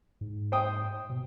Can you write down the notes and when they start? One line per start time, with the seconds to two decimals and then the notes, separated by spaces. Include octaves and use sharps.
0.21 G#2
0.52 C5 G5 D#6
1.10 B2